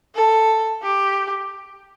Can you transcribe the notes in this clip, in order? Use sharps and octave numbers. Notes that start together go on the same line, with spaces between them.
A4
G4